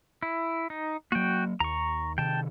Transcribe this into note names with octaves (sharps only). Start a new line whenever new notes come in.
E4
D#4
F#3 A#3 F#4 G5
D#2 A#5 C#6
C3 D#3 G5 A5